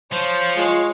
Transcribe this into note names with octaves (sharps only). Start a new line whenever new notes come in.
F3 C5 C#5 F5
G#3 F4